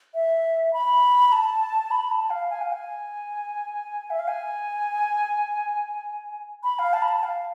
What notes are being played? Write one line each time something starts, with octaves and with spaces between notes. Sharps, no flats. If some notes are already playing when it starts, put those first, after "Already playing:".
E5
B5
A5
B5
A5
F5
G#5
F5
G#5
E5
F5
G#5
B5
F5
A5
B5
A5
F5